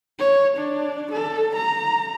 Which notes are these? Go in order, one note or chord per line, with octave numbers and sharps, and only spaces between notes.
C#5
D4
A4
A#5